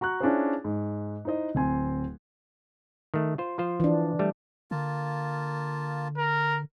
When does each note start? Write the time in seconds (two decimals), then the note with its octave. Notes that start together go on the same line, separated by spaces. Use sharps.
0.01 F#4 A#5 C#6 F#6
0.20 C#4 D4 E4 F4 G#4 C5
0.64 G#2
1.25 D#4 E4 C5 D#5
1.55 D1 C4 G#5 C6
3.14 D#3 A3
3.38 F4 C5
3.58 F3 F4 C5
3.80 E3 D4
4.19 G3 A3
4.71 D3 A#3 F4 A5
6.18 A#4